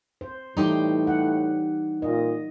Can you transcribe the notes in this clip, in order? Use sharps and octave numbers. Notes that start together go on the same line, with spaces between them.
C5
A2 E3 G3 D#4 G4 C6
F#5
A#2 D#5